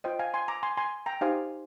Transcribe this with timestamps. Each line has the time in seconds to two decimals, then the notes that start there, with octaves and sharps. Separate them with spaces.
0.04 F4 C5 D#5 G5
0.19 F5 G#5
0.34 G#5 C6
0.48 A#5 D6
0.63 G#5 C6
0.77 G#5 C6
1.06 G5 A#5
1.21 D#4 G4 C5 F5 G#5